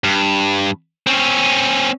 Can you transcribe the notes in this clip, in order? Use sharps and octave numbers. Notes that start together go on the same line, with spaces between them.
G2
C4 C#4